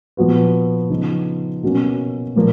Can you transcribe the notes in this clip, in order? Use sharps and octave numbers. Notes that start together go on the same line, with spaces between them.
A#2 F3 B3 F#4 B4
C#3 F3 B3 D#4
B2 F#3 A#3 C#4
A#2 F3 A#3